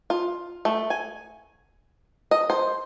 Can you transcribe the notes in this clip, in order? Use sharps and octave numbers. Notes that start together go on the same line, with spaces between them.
F4
A3
G#5
D#5
C5